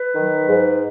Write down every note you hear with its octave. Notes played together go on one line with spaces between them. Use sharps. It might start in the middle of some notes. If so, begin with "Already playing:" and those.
Already playing: B4
D#3 F#3
G#2